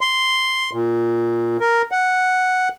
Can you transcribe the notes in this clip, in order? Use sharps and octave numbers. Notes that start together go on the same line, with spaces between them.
C6
A#2
A#4
F#5